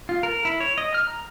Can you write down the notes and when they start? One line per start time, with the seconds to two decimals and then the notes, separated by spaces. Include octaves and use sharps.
0.09 F4
0.23 A#4
0.45 E4
0.60 C#5
0.78 D#5
0.94 F6
1.07 A#5